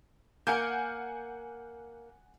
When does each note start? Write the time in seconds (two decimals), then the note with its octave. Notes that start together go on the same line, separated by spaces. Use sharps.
0.47 A#3 A#4 F#5 G#5 G6